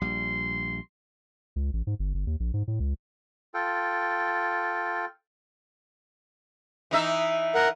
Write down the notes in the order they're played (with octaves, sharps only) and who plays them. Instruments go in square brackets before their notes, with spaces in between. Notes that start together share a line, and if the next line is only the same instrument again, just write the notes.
[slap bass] A#1 G3 [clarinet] C6
[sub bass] C#2
A1
G#2
G1
G1
D#2
A#1
G#2
A2
C#2
[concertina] F4 A4 G5
[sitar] E3 D#4 E5
[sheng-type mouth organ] A#4 F#5